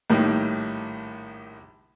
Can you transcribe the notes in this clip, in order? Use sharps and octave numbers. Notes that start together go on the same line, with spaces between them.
A#1 A2 D#3 G3